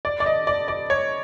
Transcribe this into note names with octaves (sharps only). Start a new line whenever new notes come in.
D5
D5
D#5
D5
D5
C#5